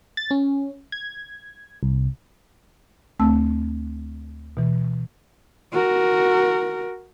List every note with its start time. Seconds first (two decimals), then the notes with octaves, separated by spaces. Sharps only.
0.17 A6
0.31 C#4
0.92 G#6
1.83 C2
3.20 D2 A3 C4 A5 E6
4.57 B2 E3
5.72 F#4 A#4